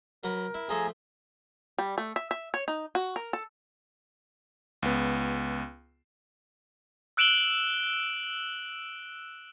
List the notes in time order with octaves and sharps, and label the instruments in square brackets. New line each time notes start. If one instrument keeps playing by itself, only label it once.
[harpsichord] F#3 B4 F#5 [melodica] A#4
[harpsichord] E4
[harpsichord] F3 A3 A4 [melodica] G#4 G#5 A#5
[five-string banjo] G3
A3
E5
E5
C#5
D#4
F#4
A#4
A4
[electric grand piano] C#2 B3
[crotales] E6 F#6 D7 E7 F#7 G7